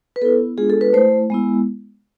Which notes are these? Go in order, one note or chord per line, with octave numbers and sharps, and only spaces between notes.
B4
B3 E4 A4
G#3 B3 D4 F4 G#4
A4
B4
A3 E4 C5
G#3 B3 E4